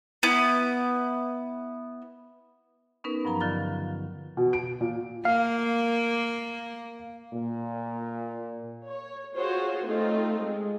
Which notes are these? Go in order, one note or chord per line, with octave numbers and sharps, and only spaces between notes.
B3 E4
B3 C#4 D#4 A#4 B4
G2 F3 F#3 A#5
D3 D#3 F4 F5 A6
B2
D7
A#2
A#3 F5
A#2
C#5
F4 F#4 G#4 C5 C#5
A3 C4 D#4 F4
G#3